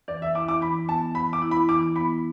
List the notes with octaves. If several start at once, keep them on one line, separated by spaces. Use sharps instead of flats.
E3 D5
E5
E4 D6
D6
E3 B5
B3 A5
E3 B5
D6
E4
B5
E3 D6
B3 B5